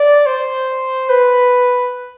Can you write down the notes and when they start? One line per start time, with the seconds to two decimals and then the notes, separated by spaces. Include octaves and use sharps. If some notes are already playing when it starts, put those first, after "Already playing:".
Already playing: D5
0.26 C5
1.09 B4